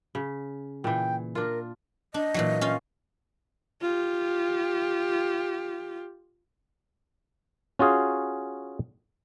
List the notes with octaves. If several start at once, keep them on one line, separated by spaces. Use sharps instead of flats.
C#3
A#2 E3 G5
D4 F4 A#4
D4 D#5
A#2 E3 F#3
C#4 F4 C6
F4 G4
C#4 F4 F#4 G#4 F5